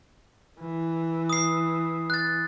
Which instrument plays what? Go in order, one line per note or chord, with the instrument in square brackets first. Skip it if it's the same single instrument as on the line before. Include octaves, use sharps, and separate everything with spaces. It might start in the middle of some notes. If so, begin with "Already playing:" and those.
[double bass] E3
[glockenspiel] D#6 C7
F#6 A6